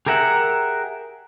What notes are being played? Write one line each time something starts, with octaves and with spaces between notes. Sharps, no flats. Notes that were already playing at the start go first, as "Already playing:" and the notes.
G4 G#4 A#4 E5 F#5